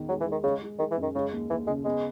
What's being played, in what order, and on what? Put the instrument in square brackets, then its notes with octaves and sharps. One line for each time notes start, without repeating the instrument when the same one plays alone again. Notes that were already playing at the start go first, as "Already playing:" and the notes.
Already playing: [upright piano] E2 D#3
[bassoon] F#3 [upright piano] G#3
[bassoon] E3
[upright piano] G#3
[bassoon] D#3
[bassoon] C#3 [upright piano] G#3
[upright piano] G#3
[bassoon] D#3 [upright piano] G#3
[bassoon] E3
[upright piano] F#2
[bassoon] D#3
[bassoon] C#3 [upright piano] G#3
[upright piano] D#2
[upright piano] D#2 [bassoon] E3
[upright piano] C#3 [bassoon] G#3
[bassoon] G#3 [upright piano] B3